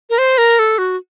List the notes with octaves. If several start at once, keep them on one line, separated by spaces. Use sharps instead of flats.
A#4
C5
A#4
A4
F#4